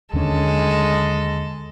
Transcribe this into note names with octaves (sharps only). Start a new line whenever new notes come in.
D#2 D3 G#3 C#4 A4